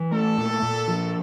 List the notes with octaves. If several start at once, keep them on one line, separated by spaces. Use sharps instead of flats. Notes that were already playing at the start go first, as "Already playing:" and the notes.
Already playing: E3
A3 A4
A#2
A#2
F3